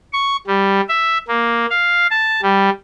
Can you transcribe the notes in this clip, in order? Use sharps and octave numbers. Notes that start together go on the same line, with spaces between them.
C#6
G3
E5
A#3
F5
A5
G3